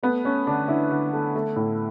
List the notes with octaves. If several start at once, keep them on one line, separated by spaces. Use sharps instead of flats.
A3 B3
A3 C#4
D3 D4
D3 E4
D3
A3
A3
A2